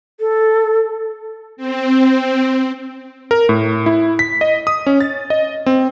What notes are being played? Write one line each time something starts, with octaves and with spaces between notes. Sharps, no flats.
A4
C4
A#4
A2
E4
B6
D#5
D#6
C#4
A6
D#5
C4